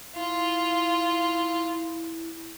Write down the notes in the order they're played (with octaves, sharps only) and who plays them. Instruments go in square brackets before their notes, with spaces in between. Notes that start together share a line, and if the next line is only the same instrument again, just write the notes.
[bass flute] E4 [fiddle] F4